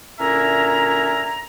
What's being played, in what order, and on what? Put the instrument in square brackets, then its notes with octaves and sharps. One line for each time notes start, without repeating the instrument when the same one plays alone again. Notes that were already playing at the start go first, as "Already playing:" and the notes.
[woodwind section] A#2 D3 C#4 E4 E5 A#5